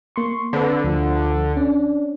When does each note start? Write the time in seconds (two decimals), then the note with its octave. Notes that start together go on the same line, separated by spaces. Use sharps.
0.16 A#3 C6 C#6
0.53 D3 C4 B4
0.84 D2 F3
1.57 C#4 D4